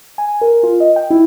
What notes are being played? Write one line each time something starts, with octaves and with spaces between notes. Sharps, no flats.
G#5
A#4
F4
D#5
G5
E4